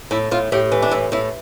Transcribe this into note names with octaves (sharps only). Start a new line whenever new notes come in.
A2 E4
A2 F4
A2 G4
E3
D4
A2 E4
A2 E4